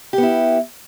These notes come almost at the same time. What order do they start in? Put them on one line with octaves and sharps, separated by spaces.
G4 B3 E4